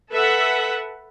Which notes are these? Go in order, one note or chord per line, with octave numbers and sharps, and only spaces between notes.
A4 B4 E5 F#5